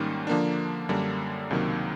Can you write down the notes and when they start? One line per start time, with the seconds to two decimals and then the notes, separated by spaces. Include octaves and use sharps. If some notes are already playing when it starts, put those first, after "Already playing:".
Already playing: G#2 D#3 G3 A#3 C#4
0.27 D3 F3 A#3 D4
0.89 F#2 D3 G3 A#3 D4
1.51 C#2 C3 D#3 F#3 A#3